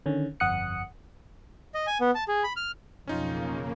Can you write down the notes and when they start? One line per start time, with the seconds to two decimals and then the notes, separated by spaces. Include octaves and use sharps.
0.06 D3 D#3 C#4
0.40 G1 F2 F#5 D#6 F#6 C#7
1.74 D#5
1.87 G#5
2.01 B3
2.15 A5
2.28 G#4
2.44 B5
2.56 F6
3.07 B1 F2 C#3 A#3 C#4 D#4 F4